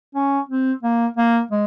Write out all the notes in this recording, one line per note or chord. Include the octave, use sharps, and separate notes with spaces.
C#4
C4
A#3
A#3
G#3